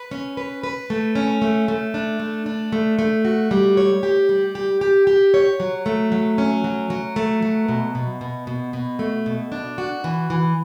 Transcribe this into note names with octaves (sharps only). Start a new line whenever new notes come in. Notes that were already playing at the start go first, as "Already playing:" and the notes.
Already playing: B4
C#4
B4
B4
A3
C#4
A3
A3
D4
A3
D4
A3
A3
F#4
G3
C#5
G4
G3
G4
G4
G4
C#5
F#3
A3
F#3
C#4
F#3
F#3
A3
F#3
B2
B2
B2
B2
B2
A3
B2
D4
F#4
E3
E3